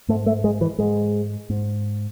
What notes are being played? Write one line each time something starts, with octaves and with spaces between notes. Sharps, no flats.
G#2 A3
A3
G#3
E3
G#2 G#3
G#2